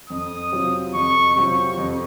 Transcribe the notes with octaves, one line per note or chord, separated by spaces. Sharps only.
F2 D#6
C3 F#3 C4 F4
F2 C#6
C3 F#3 C4 F4 C#6
F2